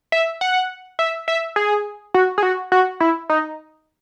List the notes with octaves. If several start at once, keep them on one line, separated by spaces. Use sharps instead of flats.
E5
F#5
E5
E5
G#4
F#4
G#4
F#4
F#4
E4
D#4